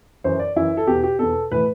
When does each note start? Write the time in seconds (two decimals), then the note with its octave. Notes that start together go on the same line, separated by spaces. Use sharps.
0.24 F#2 E3 C5
0.39 D5
0.56 F#2 E3 E4
0.77 A4
0.87 E2 B2 G4
1.04 G4
1.19 E2 B2 A4
1.52 A2 E3 B4